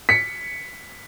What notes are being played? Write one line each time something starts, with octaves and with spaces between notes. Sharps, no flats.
B6 C#7